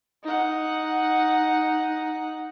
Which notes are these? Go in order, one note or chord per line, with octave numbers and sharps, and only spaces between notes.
D#4 F#5